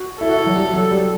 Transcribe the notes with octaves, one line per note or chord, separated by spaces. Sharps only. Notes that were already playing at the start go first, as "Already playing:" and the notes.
Already playing: F#4
E4 A4
F#4
E4
F#3
G3
F#3
G3